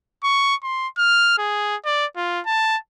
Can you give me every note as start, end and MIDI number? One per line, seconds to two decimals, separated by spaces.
0.24 0.55 85
0.63 0.88 84
0.98 1.38 89
1.38 1.76 68
1.85 2.06 74
2.16 2.41 65
2.46 2.77 81